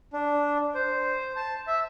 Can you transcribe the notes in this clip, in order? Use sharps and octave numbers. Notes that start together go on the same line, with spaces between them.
D4
C5
A5
E5